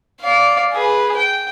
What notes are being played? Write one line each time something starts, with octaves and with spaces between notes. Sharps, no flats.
D5 F5
G#4 B4
G5